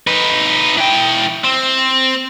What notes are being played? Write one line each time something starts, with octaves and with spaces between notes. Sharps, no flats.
D#4 B4
E3 G5
C4